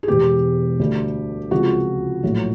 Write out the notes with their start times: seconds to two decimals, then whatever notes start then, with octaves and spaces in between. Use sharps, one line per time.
0.03 G#4
0.08 E1 E2 B2 G#3 G4
0.79 D2 D3 G3
1.51 C#2 C3 F3 G#3 F#4
2.23 A#1 A2 F#3